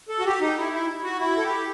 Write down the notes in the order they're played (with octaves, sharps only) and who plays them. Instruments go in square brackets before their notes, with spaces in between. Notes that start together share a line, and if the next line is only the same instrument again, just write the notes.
[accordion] A4
F#4
G4
D#4
E4
E4
F#4
E4
A4
G4